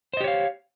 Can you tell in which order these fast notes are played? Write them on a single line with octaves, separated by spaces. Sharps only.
C5 D#5 G4 C#5 F5